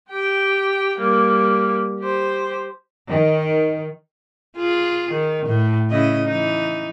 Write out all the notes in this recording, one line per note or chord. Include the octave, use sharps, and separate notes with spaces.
G4 G5
G3 A#3
G4 C5
D#3
F4 G#4
D#3
A2
C#3 E4 D#5
E3 D#4